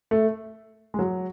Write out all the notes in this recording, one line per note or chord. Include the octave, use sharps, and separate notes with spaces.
A3
G#3
F#3